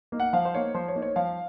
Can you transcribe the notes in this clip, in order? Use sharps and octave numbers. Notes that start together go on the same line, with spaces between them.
A#3 D#4
F#5
F3 F5
C5
A#3 D#4 C#5
F3 C5
C#5
A#3 D#4
C#5
F3 F5